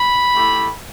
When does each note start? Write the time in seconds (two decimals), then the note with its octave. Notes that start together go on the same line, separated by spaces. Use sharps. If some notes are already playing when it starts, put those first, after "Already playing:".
Already playing: B5
0.35 A3 E4 G4